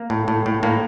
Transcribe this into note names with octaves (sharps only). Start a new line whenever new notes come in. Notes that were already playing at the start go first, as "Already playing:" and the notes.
Already playing: A#3
A2
A2
A2
A2 A#3